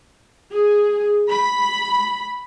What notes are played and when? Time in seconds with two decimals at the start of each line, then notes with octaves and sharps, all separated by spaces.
0.52 G#4
1.30 B5